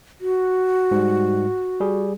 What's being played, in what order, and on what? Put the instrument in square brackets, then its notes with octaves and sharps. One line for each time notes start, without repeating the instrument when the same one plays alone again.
[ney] F#4
[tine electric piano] G#2 G3
G3 G#4